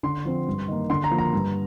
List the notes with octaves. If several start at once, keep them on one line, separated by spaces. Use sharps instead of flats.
D3 C6
F3 C4
G2
D#3 A#3
D3 C6
A#5
F3 A#3
A#5
G2